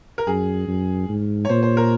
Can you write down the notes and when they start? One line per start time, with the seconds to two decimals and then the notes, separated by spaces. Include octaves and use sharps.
0.18 A#4
0.27 F#2 G#4
0.68 F#2
1.09 G#2
1.45 C#5
1.49 A#2 C5
1.63 C5
1.77 A#4